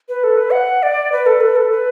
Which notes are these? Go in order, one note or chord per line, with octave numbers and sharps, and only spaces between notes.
B4
A4
B4
F#5
D5
B4
A4
B4
A4
B4